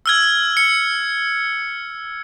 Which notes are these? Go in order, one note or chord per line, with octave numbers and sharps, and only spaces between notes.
E6 F6 G#6
C#7